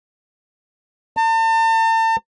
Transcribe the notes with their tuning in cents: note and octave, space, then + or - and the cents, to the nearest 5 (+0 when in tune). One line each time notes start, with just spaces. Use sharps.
A5 +40